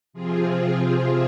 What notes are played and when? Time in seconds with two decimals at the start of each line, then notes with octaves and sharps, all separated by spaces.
0.13 C3 F3 C4 F4 G#4